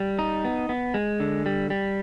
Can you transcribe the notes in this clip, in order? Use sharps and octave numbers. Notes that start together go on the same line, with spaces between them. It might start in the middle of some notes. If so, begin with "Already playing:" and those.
Already playing: G3
D#4
B3
B3
G#3
D3
G3
G3